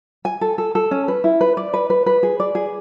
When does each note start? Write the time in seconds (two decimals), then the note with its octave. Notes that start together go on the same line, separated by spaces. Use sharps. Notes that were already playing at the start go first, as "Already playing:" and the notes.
0.25 G#5
0.41 A4
0.58 A4
0.75 A4
0.91 C#4
1.08 B4
1.24 E4
1.41 B4
1.57 D5
1.74 B4
1.90 B4
2.06 B4
2.23 G#4
2.40 D5
2.55 G#4